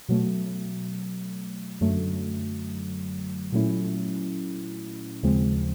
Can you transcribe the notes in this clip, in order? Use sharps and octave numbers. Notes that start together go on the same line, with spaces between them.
B2 F#3 A3
F#2 D3 F#3 A3
A#2 F#3 A3 C#4 E4
D#2 C#3 F3 G#3 C4